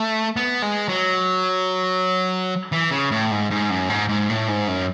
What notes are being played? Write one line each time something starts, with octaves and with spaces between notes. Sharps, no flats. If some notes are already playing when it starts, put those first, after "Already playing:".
Already playing: A3
B3
G#3
F#3
E3
C#3
A2
G#2
G#2
F#2
G#2
G#2
A2
G#2
F#2